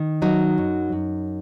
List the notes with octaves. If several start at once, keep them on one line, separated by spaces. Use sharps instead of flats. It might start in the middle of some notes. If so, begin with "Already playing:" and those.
Already playing: D#3
F#3 D#4
F#2
F#2